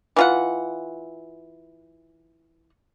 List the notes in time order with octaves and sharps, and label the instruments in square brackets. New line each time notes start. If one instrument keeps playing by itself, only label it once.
[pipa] E3 F4 F#5